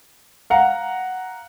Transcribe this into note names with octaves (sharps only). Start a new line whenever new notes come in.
F5 F#5 A#5